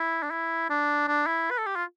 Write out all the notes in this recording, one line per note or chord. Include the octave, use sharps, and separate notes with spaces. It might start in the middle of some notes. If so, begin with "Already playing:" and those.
Already playing: E4
D4
E4
D4
D4
E4
B4
A4
G4
F4